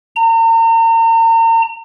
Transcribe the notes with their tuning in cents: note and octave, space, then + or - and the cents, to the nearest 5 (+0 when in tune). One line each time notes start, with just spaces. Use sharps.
A#5 -40